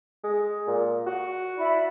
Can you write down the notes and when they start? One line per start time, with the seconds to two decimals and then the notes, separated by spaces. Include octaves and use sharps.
0.23 G#3
0.67 A#2
1.06 F#4
1.57 E4 D5 B5